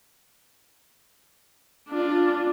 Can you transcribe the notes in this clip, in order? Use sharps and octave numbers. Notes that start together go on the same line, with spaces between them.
D4 F4